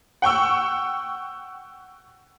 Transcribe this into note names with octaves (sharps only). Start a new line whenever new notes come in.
F#5 G5 C#6 E6